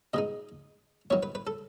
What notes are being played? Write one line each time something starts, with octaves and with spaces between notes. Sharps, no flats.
B2 G#3 D#4 D#5
D#3 F#3 B3 C#5
B4
B4
A4